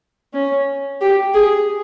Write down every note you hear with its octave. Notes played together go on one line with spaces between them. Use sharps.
C#4
G4
G#4